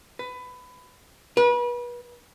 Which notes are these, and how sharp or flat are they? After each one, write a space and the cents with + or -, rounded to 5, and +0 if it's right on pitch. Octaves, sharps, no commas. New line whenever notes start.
B4 +20
B4 -35